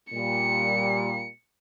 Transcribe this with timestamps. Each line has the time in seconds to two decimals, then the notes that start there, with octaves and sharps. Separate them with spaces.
0.13 A#2 G3 C#7